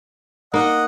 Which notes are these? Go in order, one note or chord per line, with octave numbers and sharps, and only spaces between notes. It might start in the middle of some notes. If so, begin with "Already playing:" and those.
A#3 D#4 D#5 F#5